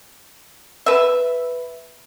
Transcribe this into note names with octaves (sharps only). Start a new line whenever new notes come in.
B4 E5